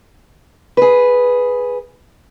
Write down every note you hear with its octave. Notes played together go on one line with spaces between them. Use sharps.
G#4 B4